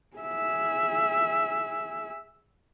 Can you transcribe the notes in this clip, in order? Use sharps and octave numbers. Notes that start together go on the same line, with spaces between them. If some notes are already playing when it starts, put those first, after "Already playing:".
G#4 E5